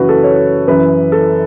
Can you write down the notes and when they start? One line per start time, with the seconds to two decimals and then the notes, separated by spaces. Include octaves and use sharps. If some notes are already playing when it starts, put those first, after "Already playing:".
Already playing: F#2 C#3 E3 F#4 B4
0.09 A4
0.23 C#5
0.68 F#2 E3 B4
1.12 A4